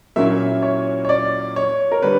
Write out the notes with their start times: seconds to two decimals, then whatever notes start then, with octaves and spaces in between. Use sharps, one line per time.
0.16 A#2 F#3 A#3 C#4 E4 E5
0.63 C#5
1.05 C#5
1.09 D5
1.56 C#5
1.92 A#4
2.02 D3 G3 B4